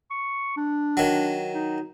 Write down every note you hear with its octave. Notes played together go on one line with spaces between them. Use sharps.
C#6
D4
D#3 F#3
D#4